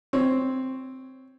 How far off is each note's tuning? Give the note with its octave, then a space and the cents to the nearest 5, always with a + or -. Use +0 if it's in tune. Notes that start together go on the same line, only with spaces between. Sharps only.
C4 +0 C#5 +0